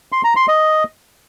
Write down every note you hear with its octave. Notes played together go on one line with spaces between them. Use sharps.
C6
A#5
C6
D#5